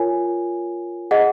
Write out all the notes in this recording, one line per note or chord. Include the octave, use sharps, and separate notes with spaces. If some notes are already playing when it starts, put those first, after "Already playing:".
Already playing: F4 A#4 C#5 G#5
G#4 D#5 F#5